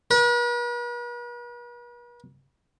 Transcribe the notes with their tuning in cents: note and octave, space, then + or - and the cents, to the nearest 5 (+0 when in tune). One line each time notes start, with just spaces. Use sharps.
B4 -45